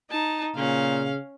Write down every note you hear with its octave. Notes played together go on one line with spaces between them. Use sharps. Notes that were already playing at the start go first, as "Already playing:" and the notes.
D#4 A5
A#2 C#3 C#4 F5